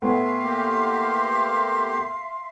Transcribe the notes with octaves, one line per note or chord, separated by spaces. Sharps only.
A2 B3 E5 F5 G#5 C6
A#3 G4